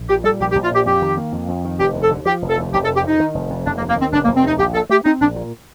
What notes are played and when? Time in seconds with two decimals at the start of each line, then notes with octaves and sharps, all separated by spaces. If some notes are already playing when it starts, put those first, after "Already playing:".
Already playing: A#1
0.09 A#2 G4
0.24 G3 A4
0.40 A#1 G4
0.51 G4
0.55 A#1
0.64 F4
0.71 A#2 G4
0.86 F2 G4
1.02 D#3
1.17 A#3
1.32 F2
1.48 F2
1.65 D#3
1.79 F1 G4
1.94 D#2
2.03 A4
2.11 D3
2.25 F3 G4
2.42 F1
2.50 A4
2.58 D#2
2.73 F1 G4
2.84 A4
2.88 F2
2.96 G4
3.04 C3 D#4
3.20 D#3
3.35 F1
3.50 F2
3.66 F1 D4
3.77 A#3
3.82 D#2
3.89 A#3
3.96 D#3 C4
4.12 F1 D4
4.24 A#3
4.28 F1
4.36 C4
4.43 D#2 D#4
4.59 A#1 G4
4.75 A#2 A4
4.89 A3 G4
5.05 C4 D#4
5.21 A#1 D4
5.36 A#2